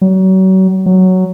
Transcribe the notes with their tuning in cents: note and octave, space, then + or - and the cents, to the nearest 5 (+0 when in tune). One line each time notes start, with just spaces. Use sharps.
F#3 +35
F#3 +5